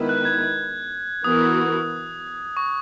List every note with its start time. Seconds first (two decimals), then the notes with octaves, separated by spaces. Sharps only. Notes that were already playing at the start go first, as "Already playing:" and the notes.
Already playing: D#3 G#3 B3 E4 B4
0.09 F#6
0.25 G#6
1.24 E3 B3 F#4 A#4 D#6
2.57 C#6